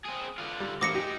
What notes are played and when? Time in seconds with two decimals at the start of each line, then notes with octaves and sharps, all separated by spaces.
0.05 C4 G#4
0.38 D3 F4
0.60 G3
0.81 A1 A#3 C5 D6 A#6 C#7
0.95 D#4 G4 G#4